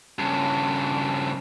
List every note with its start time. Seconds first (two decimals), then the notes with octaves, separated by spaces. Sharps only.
0.19 G2 C#3